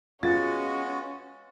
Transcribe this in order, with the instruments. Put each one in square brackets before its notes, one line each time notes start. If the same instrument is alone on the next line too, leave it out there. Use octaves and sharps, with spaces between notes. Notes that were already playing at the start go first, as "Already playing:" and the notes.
[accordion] G#3 B3 F#4 [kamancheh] C#4 [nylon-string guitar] F4 [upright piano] A6